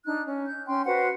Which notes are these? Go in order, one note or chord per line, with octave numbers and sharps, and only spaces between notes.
D4 D#4 F#6
C#4
G6
C#4 G5 C6
F#4 B4 C5 F#5